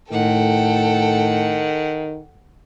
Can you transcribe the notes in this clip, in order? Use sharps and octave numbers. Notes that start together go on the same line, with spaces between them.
A2 D#3 A4 F#5 G5